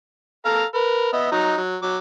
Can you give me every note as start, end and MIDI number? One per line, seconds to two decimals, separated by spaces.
0.45 0.64 69
0.45 0.64 77
0.45 0.64 82
0.74 1.11 70
0.74 1.11 71
1.13 1.28 59
1.13 1.28 75
1.13 1.28 76
1.32 1.56 54
1.32 1.56 63
1.32 1.56 82
1.57 1.76 54
1.82 1.97 54
1.82 1.97 86